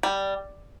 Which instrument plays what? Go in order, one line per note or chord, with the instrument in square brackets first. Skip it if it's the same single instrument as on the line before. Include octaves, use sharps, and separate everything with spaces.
[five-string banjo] G3